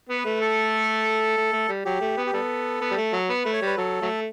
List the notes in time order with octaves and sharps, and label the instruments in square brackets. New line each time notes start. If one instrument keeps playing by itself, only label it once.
[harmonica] B3
[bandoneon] B4
[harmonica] A3
[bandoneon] A4
[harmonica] A3
A3
G3
[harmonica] F#3 [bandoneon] G4
[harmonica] A3
B3
[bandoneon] G4
[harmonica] G3 B3 [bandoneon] A4
[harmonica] B3
G3
A3
F#3
[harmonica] B3 [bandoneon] B4
[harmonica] A3
[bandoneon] C#5
[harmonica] G3 [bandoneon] B4
[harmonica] F#3 [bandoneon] A4
[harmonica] F#3 A3